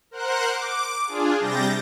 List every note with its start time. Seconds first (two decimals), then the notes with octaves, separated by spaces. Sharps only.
0.11 A#4 C5 F#5 F#6
0.50 D6
1.07 D4 F4 G#4
1.39 C3 G3 G6 A6 A#6